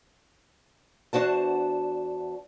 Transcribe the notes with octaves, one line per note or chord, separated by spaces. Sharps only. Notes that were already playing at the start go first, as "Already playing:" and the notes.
E2 D4 F#4 C5 A5